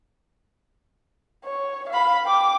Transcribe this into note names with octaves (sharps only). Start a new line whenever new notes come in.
C#5
F5 B5
G5 D6